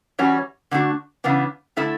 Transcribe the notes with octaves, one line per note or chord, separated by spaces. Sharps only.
E3 G3 C#4 F#4 C#5
D3 A3 D4 F#4
C#3 E3 B3 D4
D3 A3 E4 A4 E5